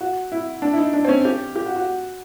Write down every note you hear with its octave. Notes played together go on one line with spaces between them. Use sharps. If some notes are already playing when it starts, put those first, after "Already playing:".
F#4
E4
D4
E4
D#4
D4
C4
C#4
G4
G4
F#4
F#4